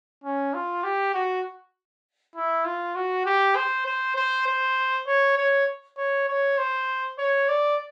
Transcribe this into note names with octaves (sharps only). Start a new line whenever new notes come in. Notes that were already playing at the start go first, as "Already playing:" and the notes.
C#4
F4
G4
F#4
E4
F4
F#4
G4
C5
C5
C5
C5
C#5
C#5
C#5
C#5
C5
C#5
D5